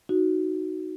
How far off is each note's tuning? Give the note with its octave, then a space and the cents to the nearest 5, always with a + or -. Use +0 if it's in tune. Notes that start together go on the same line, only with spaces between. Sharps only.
D#4 +5 F#4 +0